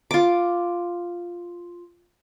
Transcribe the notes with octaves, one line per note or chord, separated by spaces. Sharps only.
F4 D6